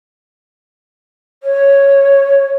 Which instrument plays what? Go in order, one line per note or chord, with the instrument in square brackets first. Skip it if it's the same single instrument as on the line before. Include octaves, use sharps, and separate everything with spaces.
[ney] C#5